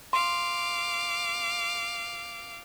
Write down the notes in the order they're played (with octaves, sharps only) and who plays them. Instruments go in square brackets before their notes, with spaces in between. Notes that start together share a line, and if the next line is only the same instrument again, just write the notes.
[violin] F5 D6 [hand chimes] C6